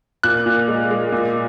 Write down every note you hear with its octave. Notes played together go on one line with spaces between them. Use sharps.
A#2 F#6
A#2
G#3
G#3
A#2